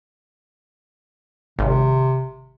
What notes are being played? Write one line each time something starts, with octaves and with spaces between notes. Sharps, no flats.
G#1 C3